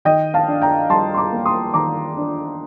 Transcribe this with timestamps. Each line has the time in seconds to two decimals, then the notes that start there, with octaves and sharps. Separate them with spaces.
0.05 D#3 D#5 G5
0.34 F5 A5
0.48 D4
0.62 G5 A#5
0.89 G3 A5 C6
1.14 C6
1.18 A#5 D6
1.33 A#3
1.46 C6 D#6
1.74 D#3 A#5 D6
2.17 D4